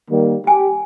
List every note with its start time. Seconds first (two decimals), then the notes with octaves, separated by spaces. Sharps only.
0.11 D#3 G3 A#3
0.47 G4 G#5